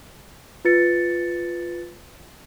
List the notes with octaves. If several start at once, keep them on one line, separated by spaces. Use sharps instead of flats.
F4 B4 A6 C#7